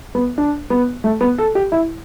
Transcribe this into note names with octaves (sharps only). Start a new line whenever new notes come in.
B3
D4
B3
A3
B3
A4
G4
E4